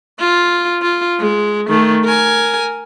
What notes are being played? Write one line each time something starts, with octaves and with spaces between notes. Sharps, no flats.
F4
F4
G#3
D#3 A3
A#4 G#5